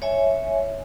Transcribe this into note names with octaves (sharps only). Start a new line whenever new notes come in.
C#5 E5 G#5